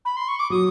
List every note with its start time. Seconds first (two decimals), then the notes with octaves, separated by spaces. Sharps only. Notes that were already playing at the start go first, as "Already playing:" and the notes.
0.05 B5
0.16 C6
0.28 C#6
0.39 D6
0.50 F#3 D#6